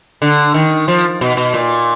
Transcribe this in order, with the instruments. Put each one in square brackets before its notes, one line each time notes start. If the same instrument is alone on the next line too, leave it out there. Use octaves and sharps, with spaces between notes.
[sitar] D3
D#3
F3
B2
B2
A#2